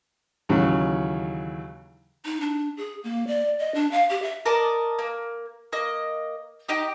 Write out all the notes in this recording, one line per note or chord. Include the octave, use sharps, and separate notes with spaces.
D#2 C#3 E3 F#3
D#4
D4
G#4
A#3
D5
D#5
D4
F5
G4
E5
A#4 D5 D#5 A5
A#3
A#3 D#5
D#4 G4 D#5